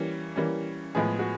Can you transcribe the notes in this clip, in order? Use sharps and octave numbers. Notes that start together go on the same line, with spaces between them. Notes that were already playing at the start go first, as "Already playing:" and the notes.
Already playing: E3 G3 A#3 C#4
E3 G3 A#3 C#4
A2 F3 G#3 B3 G#4
F#4